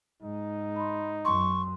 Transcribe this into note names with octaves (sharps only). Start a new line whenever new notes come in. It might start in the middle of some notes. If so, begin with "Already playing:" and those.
G#2 D#4
B5 C6
F#2 C6 C#6